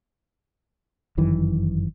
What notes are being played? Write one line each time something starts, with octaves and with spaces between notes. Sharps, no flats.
G1 F#2 D#3 E3